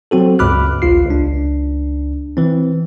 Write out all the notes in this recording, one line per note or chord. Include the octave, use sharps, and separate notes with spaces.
F#3 C4 F#4 A4
C#2 G2 B5 D6 F6 F#6
A1 D2 F4 C7
C#2 D4
E3 C4